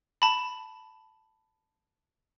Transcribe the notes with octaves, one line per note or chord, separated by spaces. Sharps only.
A5 B5